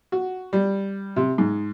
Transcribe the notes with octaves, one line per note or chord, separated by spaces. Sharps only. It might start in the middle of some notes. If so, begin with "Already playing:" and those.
F#4
G3
C3
G#2